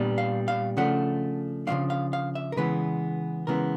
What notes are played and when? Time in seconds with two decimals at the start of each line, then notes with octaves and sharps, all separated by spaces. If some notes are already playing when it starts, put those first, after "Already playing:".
Already playing: A#2 G3 B3 D4
0.18 F5
0.48 F5
0.77 C#3 F3 A3 D4 F#5
1.67 C#3 F3 A3 D4 F5
1.90 F5
2.13 F5
2.35 E5
2.52 A#4
2.57 C#3 E3 G#3 B3 B4
3.47 C#3 E3 G#3 B3 A#4